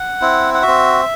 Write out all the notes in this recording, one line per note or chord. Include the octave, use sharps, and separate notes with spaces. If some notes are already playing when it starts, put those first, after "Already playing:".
Already playing: F#5
C4 E4
F#5
F#4 E5
C4